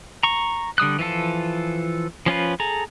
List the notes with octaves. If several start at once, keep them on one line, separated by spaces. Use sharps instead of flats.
A#5 C#6
D3 G3 D#6 F#6
E3 F3 F4 A4
F3 C#4 F4 B4
G#4 A4 A#5